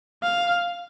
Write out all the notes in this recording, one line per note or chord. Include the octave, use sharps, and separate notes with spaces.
F5